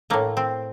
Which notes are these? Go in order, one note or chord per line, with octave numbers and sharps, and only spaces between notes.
A2 A3 A#3
C4